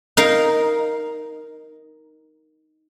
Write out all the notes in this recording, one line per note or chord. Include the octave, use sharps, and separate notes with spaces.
D#4 A#4 F5